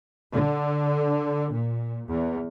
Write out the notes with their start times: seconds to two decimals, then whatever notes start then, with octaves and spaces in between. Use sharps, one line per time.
0.32 D3
1.52 A#2
2.07 E2